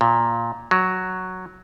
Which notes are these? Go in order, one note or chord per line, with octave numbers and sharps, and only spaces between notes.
A#2
F#3